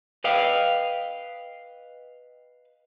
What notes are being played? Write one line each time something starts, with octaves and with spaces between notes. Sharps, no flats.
B4 D#5 F5 G5